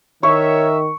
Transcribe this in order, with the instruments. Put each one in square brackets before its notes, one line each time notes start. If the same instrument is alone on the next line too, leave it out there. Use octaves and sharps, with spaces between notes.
[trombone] D#3 [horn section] A#4 E5 [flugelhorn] C#5 [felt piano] C#6